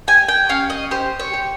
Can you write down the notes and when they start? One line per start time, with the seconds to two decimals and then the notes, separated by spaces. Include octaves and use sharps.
0.08 G4 G#5
0.28 G5
0.49 C#4 F5
0.70 D#5
0.91 G4 C5
1.19 C#5
1.33 G4